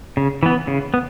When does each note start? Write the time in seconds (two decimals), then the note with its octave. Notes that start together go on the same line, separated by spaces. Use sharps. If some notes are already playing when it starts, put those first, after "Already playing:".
0.17 C#3
0.43 E3 B3
0.67 C#3
0.94 B3